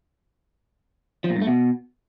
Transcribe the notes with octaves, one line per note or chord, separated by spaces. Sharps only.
F3
A#2
G2
A3
B2